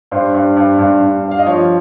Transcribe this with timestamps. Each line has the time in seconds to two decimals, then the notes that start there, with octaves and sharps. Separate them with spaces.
0.11 G2 C5
0.34 G2
0.56 G2
0.78 G2
1.01 G2
1.24 G2
1.31 F5
1.39 D#5
1.46 F3 C#5